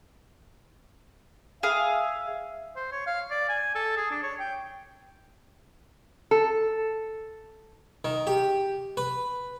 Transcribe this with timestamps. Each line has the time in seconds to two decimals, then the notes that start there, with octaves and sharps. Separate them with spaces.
1.63 G#4 E5 F5
2.76 C5
2.92 C#5
3.06 F5
3.31 D5
3.48 G#5
3.75 A4
3.97 G#4
4.11 D4
4.23 C#5
4.40 G5
6.31 A4
8.05 D#3
8.27 G4
8.97 B4